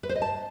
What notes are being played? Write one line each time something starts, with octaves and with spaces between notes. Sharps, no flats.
B4
C5
D#5
A5